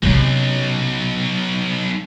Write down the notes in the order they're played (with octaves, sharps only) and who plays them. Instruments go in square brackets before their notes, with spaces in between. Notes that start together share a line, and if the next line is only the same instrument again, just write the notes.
[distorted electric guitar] B1 [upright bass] C3 C#4